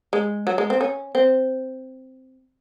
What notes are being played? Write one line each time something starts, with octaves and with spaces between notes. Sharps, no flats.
G#3
F#3
G#3
C4
C#4
C4